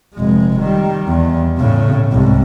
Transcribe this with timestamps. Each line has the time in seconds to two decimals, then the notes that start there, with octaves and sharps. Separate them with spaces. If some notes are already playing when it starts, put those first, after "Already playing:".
0.14 F1 G#3
0.60 D#3 G3
1.08 E2
1.58 A2 C#3
2.12 C2 G#2